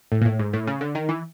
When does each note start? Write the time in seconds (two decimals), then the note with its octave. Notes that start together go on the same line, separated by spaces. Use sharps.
0.12 A2
0.21 A#2
0.25 A2
0.39 G#2
0.53 A2
0.67 C#3
0.81 D3
0.95 D#3
1.09 E3